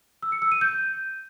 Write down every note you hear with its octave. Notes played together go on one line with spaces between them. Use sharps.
E6
C#7
E6
D#7
G6